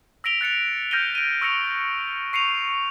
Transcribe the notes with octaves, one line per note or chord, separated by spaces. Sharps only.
E6 A#6 B6 D7 F7 G7
F#6 A6 C#7 F7
F6 G6 A#6 C#7 D#7 G7
D7 D#7
C#6 E6 A#6 C#7 F7
C#6 C7 C#7 D#7 F7